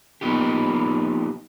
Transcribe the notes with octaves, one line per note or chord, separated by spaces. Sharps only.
F3 A#3 B3 D#4 F4 G4